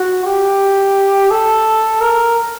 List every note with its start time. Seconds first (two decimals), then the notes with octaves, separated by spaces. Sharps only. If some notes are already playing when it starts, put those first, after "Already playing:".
Already playing: F#4
0.25 G4
1.31 A4
2.01 A#4